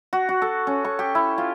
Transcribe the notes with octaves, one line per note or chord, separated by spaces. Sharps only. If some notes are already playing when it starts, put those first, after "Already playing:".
F#4
F#4
A4
C#4
C#6
G4
E4
F4